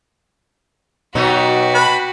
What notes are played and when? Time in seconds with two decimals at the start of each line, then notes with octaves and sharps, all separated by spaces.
1.15 B2 F#3 B3 D#4 F#4 G4
1.74 B4 A5 B5